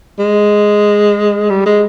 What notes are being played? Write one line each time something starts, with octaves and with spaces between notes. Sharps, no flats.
G#3
G3
G#3